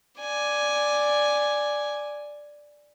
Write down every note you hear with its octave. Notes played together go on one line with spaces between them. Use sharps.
D5 G#5